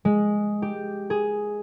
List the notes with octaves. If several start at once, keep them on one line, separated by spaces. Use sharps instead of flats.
G#3
G4
G#4